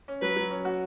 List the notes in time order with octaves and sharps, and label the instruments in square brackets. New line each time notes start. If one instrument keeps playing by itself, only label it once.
[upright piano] C#4
[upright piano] F#3 [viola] B4
[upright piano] F#3
C#4
F#4